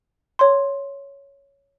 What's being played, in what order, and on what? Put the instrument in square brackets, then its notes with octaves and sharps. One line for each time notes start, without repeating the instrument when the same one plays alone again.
[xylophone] C#5 C6